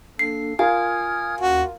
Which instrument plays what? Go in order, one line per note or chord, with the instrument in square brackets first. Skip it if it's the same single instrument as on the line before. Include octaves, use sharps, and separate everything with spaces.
[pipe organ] A#3 D4 A4 [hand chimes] C7
[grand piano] F4 A#4 F5 [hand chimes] G#5 [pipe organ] D#6 F6 G#6
[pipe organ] D#2 C#4 [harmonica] F#4